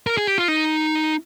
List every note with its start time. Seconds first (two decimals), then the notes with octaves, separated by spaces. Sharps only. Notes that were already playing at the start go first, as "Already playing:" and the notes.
0.07 A#4
0.17 G#4
0.27 G4
0.38 F4
0.48 D#4